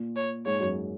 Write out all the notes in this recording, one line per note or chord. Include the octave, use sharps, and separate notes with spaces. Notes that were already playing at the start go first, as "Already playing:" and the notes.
Already playing: A#2
C#5
G#2 C#5
F#2